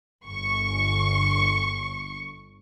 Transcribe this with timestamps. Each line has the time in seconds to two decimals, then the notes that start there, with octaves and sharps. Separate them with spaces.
0.24 G1 C#6